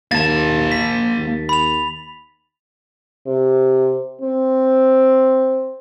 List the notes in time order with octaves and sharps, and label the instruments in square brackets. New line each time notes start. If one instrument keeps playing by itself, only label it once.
[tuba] D#2 [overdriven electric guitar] A#3 A5 [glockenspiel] A6
[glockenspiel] B6
[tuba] D#2
[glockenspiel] B5 F7
[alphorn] C3
C4